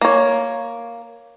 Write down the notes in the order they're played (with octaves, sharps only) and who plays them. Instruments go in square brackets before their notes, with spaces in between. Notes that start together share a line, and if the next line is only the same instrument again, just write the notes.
[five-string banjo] A#3 C#5